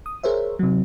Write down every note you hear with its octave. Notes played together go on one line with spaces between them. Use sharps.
D#6
G#4 A#4 C5 C#5 E5
C3 F#3